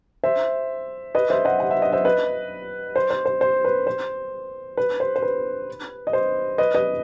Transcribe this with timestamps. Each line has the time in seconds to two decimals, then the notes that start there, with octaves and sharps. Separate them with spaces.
0.24 C5 E5
1.15 B4 D#5
1.30 C5 E5
1.45 D#5 F#5
1.60 F#5
1.71 E5
1.82 D#5
1.92 C5 E5
2.05 B4 D#5
2.96 C5
3.11 C5
3.26 C5
3.41 C5
3.65 B4
3.87 C5
4.77 B4
5.00 C5
5.16 C5
5.22 B4
6.07 D#5
6.13 C5
6.58 B4 D#5
6.75 B4 D#5